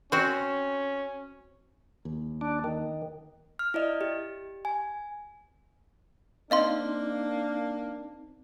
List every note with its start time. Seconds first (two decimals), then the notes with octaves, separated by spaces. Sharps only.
0.12 C4 C#4 F#4
2.05 D#2
2.41 D4
2.64 D#3
3.59 F6
3.74 E4 D5 D#5
4.01 G4
4.65 G#5
6.51 A#3 C4 D4 D#4 D#5 F5 C6